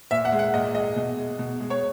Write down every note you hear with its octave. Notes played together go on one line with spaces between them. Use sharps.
A#2 E5
F#5
G#3
F#5
A#2 D#5
G#3 D#5
B2
G#3
B2
G#3
C#5